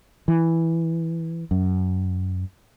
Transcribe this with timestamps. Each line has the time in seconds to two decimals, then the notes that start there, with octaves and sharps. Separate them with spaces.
0.28 E3
1.51 F#2